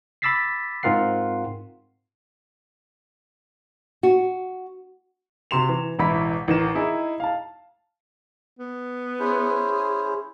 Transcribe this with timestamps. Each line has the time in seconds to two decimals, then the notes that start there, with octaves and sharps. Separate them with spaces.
0.22 B5 D6 E6 A6 B6 C7
0.83 G#2 C4 F4 A#4 F#5 C7
4.03 F#4
5.51 C3 F#4 C6 E7 F7
5.69 E3
5.99 E1 A1 E4 B5 B6
6.48 A1 D#3 E7
6.75 D#4 E4 G#4
7.20 F5 A5
8.59 B3
9.19 C#4 E4 G#4 C5